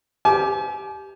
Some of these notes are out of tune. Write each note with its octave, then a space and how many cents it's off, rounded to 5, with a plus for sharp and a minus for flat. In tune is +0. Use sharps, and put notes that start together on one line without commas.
G4 +0 G#5 +40